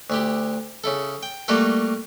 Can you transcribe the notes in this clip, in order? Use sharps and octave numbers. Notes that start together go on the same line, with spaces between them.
D2 E4 G4
C#3 E4 A4
G5
G3 A3 A#3 F#4 G4 A4